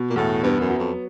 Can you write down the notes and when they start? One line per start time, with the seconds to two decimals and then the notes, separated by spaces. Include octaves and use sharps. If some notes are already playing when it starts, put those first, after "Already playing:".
Already playing: B2
0.10 A#2
0.16 E2 A2
0.43 G2 B3
0.60 F#2
0.70 F#3
0.79 F2